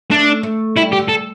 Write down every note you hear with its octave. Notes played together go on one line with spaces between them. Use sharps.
A3 D4
A3
G3 E4
G4
D3
A4